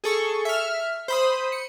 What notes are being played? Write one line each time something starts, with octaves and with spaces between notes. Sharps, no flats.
G#4 A4 C#6
E5 F6
C5 B5 D#6
C#7